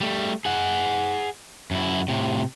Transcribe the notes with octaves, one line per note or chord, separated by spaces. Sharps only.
G3 A3
G#4 F#5
F#2 E4
A2 C3